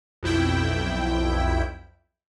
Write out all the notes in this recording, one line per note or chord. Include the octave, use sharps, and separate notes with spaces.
B1 F2 E4 G5